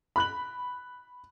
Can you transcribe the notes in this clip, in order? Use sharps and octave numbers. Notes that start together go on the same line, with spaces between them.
B5 F#6 F#7